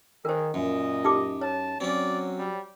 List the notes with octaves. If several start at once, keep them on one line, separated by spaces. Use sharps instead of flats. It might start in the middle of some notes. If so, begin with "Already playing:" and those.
D#3 G#4 A#4 C5
F#2 A#2 D#5
D#4 G4 D6
C#5 A5
F#3 C4 C#4 D5
G3